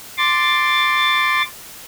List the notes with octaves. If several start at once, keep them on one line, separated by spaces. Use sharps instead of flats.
C6 D6 A6